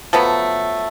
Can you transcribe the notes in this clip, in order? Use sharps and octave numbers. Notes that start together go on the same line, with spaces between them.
F3 F#3 A3 B3